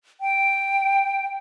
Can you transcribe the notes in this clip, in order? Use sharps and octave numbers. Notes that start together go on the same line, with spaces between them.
G5